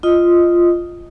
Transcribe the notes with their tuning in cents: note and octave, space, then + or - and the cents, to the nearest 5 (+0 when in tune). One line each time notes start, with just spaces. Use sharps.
F4 -10 D#5 +0 D#6 +0